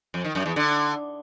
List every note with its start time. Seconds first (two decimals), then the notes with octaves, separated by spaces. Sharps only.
0.14 F2
0.25 D#3
0.35 F#2
0.46 E2
0.56 D3